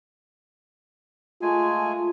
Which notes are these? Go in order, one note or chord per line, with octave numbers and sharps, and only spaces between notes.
G#3 A3 F4 G#5